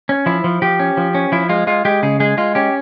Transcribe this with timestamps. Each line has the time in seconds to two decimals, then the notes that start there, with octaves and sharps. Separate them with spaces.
0.09 C#4
0.26 F3 E4
0.44 F3
0.62 F3 G4
0.80 C#4
0.97 F3
1.15 C#4
1.32 F3 E4
1.49 G#3 F4
1.67 G#3 F4
1.85 G#3 G4
2.03 C#3 G#4
2.20 G#3 G#4
2.38 G#3 F4
2.55 C#4 G4